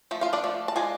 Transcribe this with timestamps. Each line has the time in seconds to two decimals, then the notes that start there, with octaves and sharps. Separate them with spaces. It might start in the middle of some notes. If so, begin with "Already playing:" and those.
0.11 F3 A3
0.21 F4 F5
0.33 D4 D5
0.44 F3 A3
0.68 A5
0.76 G#3 D4 F4 G#5